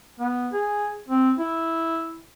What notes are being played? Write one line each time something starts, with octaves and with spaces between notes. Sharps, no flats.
B3
G#4
C4
E4